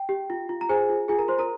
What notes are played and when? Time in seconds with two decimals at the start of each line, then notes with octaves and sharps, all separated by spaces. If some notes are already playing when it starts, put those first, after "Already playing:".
Already playing: G5
0.09 G4
0.30 F4
0.49 F4
0.61 A#5
0.69 G#4 C5 G#5
0.90 F4
1.08 F4 G#4 G#5
1.18 A#4 A#5
1.28 F4 C5 C6
1.38 A#4 A#5